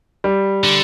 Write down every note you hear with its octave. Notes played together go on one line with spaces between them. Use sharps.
G3
D3